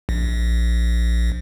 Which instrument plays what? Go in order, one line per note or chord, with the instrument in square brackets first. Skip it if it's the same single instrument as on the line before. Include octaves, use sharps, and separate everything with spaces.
[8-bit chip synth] A#1